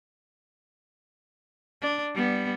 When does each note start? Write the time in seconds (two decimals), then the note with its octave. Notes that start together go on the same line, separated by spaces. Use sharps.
1.81 D4
2.14 G3 B3